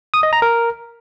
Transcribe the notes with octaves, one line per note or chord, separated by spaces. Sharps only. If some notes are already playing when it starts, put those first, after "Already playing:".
D#6
D#5
A#5
A#4